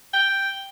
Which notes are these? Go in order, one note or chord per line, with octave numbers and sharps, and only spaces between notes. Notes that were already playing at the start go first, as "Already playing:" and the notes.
G5